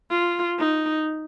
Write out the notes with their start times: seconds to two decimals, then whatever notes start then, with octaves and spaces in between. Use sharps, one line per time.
0.10 F4
0.58 D#4